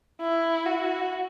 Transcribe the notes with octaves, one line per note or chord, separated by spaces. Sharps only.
E4
F#4